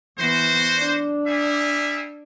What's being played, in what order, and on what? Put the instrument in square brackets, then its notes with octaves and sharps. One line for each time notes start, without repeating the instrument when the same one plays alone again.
[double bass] E3 B3 [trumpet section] F#4 C5
[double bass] D4
[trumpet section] G3 G#4 E5